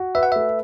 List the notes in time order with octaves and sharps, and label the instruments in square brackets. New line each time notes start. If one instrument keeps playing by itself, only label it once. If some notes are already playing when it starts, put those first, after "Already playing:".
Already playing: [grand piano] F#4
[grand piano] B4 [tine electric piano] E5
[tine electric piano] F#5
[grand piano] A3 [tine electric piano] E5